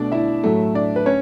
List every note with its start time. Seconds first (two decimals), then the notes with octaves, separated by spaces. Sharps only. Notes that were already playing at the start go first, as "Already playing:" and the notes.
Already playing: B2 A3 D4 D5
0.12 E4 E5
0.44 A2 F#3 A3
0.75 D4 D5
0.96 B4
1.06 C#4 C#5